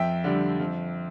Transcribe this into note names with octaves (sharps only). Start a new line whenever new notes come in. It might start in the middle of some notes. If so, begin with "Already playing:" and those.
Already playing: F2 E5 G5
D3 G3
F2